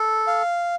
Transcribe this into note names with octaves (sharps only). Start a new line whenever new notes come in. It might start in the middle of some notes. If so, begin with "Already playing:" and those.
Already playing: A4
F5